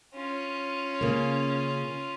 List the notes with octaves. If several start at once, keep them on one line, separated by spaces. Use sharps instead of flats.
C#4 F4
C#3 A#3